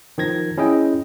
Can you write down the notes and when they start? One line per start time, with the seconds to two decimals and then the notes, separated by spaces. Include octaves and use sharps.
0.18 D#3 F3 G#6 A#6
0.58 C#4 E4 G#4 D#5 G5